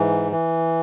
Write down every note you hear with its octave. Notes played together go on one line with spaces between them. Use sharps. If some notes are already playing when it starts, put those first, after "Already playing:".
Already playing: G#2 E3
E3